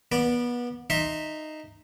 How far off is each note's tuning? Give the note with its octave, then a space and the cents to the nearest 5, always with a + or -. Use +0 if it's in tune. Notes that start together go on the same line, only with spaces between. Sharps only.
B3 -25 D5 +0
D#4 -10 E5 -10 C6 +15